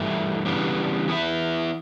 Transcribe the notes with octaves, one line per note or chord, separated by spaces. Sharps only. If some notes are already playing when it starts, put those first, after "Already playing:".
Already playing: G2 E3 A3 E4
C#3 E3 G3 B3 D4
E3 B3 E4